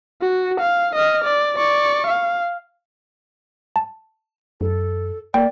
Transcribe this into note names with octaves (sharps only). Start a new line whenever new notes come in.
F#4
F5
D#5 F6
D5
D5 C#6
F5
A5
F#2 A4
A#3 D5 G5